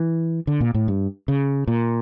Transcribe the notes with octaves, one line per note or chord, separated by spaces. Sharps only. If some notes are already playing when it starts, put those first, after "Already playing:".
Already playing: E3
D3
A#2
A2
G2
C#3
A#2